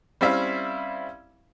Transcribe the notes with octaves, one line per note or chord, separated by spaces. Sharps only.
G3 C4 C#4 E4 E5 F5